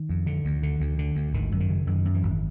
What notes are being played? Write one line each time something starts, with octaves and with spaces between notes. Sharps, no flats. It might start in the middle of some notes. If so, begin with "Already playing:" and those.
Already playing: D#3
F2
D3
D2
D3
D2
D3
D2
G#1 D#3
F#2
D#3
C#3
F#2 D#3
F#2
E3
G#1